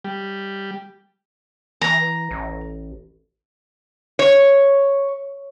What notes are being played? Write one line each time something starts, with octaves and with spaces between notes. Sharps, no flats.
G3
E3 A#5
A1
C#5